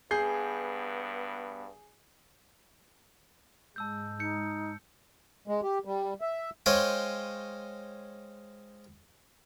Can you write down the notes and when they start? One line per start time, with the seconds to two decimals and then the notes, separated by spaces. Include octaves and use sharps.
0.11 G2 B3 G#4 G6 C7
3.76 G#2 G#3 A5 E6 G6
4.20 D#4 G6 C#7
5.48 G#3
5.63 G4
5.85 G3
6.21 E5
6.66 G#3 C5 C#5 D#5 F5 G5